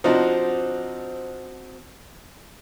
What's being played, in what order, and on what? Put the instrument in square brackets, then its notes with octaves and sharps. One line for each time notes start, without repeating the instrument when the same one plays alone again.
[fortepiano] F3 D4 D#4 [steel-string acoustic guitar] C4 F#4 C5